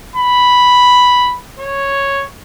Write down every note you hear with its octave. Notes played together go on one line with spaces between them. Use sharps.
B5
C#5